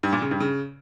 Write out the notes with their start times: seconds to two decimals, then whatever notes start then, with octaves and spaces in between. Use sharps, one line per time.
0.03 G2
0.13 A#2
0.22 C#3
0.31 G2
0.40 C#3